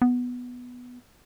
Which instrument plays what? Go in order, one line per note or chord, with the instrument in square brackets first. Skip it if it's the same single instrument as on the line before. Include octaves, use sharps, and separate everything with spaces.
[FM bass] B3